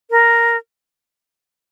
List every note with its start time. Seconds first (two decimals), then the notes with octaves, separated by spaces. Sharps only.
0.11 A#4